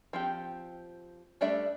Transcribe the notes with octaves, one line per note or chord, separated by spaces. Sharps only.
F3 C4 G4
G3 A3 D4 D5 E5